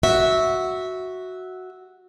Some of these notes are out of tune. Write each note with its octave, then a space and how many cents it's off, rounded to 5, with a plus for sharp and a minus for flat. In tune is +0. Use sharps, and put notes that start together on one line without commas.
F#4 +0 E5 -10